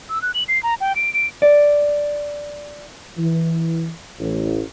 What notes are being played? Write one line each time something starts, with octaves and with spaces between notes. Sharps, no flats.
E6
F#6
F#7
C7
A#5
G5
D7
D7
D5
E3
A1